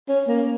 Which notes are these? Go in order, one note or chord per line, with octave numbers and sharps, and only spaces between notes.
C#4
A#3